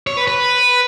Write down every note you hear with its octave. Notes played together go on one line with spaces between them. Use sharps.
C#5
B4
B4